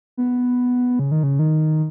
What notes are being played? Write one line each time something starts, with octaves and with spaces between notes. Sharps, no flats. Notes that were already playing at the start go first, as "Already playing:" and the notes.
B3
C#3
D#3
C#3
D#3